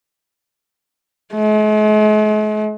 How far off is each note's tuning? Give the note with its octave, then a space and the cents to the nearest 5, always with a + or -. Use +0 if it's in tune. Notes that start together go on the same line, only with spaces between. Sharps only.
G#3 +45